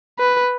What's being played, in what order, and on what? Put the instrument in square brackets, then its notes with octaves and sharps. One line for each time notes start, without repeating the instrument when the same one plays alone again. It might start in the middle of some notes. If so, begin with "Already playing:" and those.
[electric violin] B4